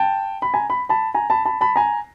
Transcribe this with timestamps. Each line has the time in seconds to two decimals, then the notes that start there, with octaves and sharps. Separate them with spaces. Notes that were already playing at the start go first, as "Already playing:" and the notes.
Already playing: G5 A5
0.42 B5
0.54 G#5 A#5
0.70 B5
0.89 A5 B5
1.14 G#5 A#5
1.30 A5 B5
1.45 A5 B5
1.61 A5 B5
1.76 G#5 A#5